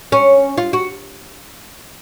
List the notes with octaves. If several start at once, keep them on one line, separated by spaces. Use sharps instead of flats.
C#4
F4
F#4